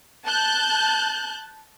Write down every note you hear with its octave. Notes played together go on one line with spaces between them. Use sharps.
A5 F#6 G6